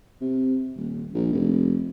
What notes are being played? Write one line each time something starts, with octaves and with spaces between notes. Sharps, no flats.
C3
D#1
A#1
F1